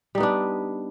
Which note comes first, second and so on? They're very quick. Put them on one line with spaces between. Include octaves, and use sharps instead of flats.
G3 D#4 B3 D4